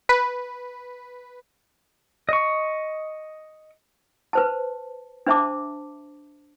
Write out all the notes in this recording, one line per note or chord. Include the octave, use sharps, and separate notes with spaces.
B4
D#5 C#6
B4 C5 A5
D4 C5 E5 A5 D6